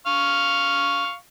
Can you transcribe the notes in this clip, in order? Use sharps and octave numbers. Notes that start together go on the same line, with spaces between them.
F5 C#6